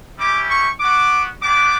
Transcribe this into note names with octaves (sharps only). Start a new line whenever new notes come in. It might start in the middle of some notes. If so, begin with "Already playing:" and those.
G3 C#4 E4 G4 D6
C#6
B3 F#4 D6
B3 D4 G4 D6